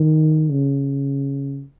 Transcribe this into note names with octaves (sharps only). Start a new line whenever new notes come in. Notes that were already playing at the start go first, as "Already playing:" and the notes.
Already playing: D#3
C#3